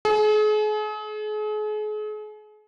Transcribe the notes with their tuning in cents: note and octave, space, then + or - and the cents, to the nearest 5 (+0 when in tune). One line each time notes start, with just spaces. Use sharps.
G#4 +40